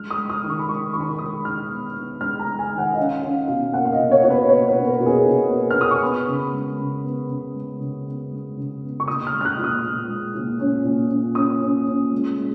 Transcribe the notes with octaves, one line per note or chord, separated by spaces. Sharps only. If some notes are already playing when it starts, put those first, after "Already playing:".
Already playing: G#3 F6
D#6
G#3
D#6
D#3
C#6
B5
G#3 C#6
D#3 C#6
B5
C#6
G#3 D#6
D#3 F6
B3
B3
G#3 F6
A#5
G#3
G#5
D#3
F#5
D#5
C#4 F5
C#4 F5
B2 F5
A#3 F#5
F5
D#5
B2
C#5
B2 C#5
B4
A#3 C#5
B4
B2
A#4
B2
G#4
B2
A#3 B4
F6
A#3 D#6
C#6
B3 B5
C#3
G#3
C#3
B3
C#3
G#3
C#3
B3
G#3
C#3
B3
C#6
A#2 D#6
F6
G#3
F6
F#6
A#2
D#6
A#2
G#3
A#2
C#4
A#2
C#4
C#4 D#6
C#4
C#4
G#3
G#3